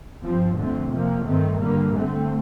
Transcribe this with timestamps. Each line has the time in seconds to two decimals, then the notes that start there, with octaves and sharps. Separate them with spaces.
0.22 G2 F3 C4
0.57 F2 D3 A3 C4
0.90 C3 F3 A#3
1.25 G2 D#3 A3 C4
1.60 G2 D3 G3 A#3
1.94 D3 A3 C4